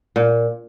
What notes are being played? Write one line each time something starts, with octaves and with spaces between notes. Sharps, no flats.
A#2